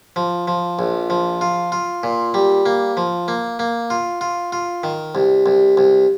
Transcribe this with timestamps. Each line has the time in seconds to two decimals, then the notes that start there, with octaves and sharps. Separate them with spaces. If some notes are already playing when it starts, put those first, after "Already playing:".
0.16 F3
0.48 F3
0.79 A#1
1.10 F3
1.41 F4
1.72 F4
2.03 A#2
2.34 G3
2.66 A#3
2.97 F3
3.28 A#3
3.59 A#3
3.90 F4
4.21 F4
4.52 F4
4.84 D#3
5.15 C2
5.46 C2
5.77 C2